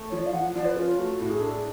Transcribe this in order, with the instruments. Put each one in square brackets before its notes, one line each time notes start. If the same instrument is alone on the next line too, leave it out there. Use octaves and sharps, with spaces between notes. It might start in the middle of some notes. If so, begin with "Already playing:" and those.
Already playing: [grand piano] A3
[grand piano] F3 [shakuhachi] C#5
[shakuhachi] D5
F5
[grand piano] F3 [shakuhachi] F#5
[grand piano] F3 [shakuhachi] D5
[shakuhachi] B4
[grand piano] C#4 [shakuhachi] F4
[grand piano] A3 [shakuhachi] F#4
[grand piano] A2 [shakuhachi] F#4
[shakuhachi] G#4
[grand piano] D4 [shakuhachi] A4
[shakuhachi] G#4